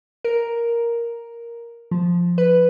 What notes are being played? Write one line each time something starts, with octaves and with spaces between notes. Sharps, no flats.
A#4
F3
B4